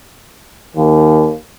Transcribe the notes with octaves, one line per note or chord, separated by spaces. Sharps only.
D#2